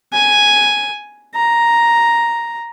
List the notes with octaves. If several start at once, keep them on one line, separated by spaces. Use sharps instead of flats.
G#5
A#5